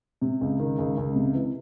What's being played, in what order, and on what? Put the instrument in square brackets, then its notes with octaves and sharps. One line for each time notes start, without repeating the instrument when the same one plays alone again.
[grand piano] C3
C#2
D#3
C#2
C#2
C3
E3